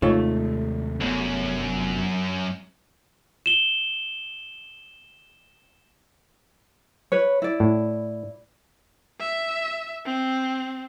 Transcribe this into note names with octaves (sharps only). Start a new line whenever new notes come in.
D#2 C3 G#3 A3 D#4 F4 C#5
F1 C2 F#2 B3
E7 G7
B4 C#5
E4 D5
A2
E5
C4